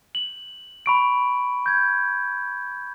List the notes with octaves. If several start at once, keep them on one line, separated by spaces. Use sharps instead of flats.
F#7
B5 C#6 D7
G6 G#6